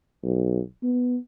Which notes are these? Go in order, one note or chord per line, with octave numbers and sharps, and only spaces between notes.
B1
B3